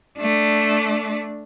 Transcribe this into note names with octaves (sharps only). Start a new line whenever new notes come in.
A3 D4